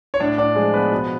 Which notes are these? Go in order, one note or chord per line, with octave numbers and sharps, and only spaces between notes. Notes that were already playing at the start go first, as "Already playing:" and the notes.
C#5
A2 D4 D5
A2 D4 D5
F3 G#3 G#4
F3 B3 B4
B2